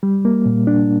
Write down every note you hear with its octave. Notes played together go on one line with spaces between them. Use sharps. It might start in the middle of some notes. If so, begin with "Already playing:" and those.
G3
A#3
A#2
D4